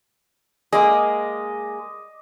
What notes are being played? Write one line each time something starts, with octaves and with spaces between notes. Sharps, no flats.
G#3 A#3 G#4 D#5 D6